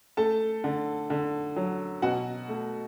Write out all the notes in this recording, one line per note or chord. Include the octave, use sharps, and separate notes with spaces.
A3 A4 A5
D3
D3
F#3
B2 F#4 F#5
A3